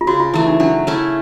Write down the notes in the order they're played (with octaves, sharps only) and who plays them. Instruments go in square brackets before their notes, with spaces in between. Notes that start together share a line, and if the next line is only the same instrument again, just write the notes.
[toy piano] F4
[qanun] C#3 [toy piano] F#4
[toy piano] F4
[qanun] E3 A3 [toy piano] E4
[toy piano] D#4
[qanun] F#3 [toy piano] D4
[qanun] A3 C#4 E4